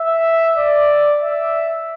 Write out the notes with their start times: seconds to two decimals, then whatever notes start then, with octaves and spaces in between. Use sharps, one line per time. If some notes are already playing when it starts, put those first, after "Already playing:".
Already playing: E5
0.57 D5
1.22 E5